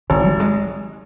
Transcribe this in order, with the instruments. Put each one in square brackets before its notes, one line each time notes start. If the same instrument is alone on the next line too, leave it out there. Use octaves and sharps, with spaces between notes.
[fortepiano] G#1 [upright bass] C#3
[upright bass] G3
G#3